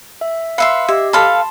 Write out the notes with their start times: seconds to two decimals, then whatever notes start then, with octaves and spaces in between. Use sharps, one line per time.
0.21 E5
0.58 B4 E5 F5 C6 C#7
0.88 G4 D#5 E5
1.13 A4 F5 A5 B5 C6